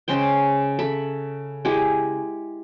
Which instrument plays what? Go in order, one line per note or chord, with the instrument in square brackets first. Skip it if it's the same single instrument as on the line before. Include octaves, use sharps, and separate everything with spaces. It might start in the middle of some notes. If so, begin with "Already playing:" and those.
[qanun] C#3 G#3 C5 G5
A4 E5 B5
G#3 E4 G4